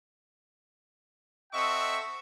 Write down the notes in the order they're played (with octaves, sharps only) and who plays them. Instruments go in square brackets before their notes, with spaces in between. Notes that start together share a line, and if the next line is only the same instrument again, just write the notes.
[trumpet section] C4 A4 D#5 E5 F#5 C#6